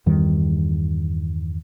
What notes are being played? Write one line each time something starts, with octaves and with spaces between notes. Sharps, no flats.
E2 G2 D#3 G3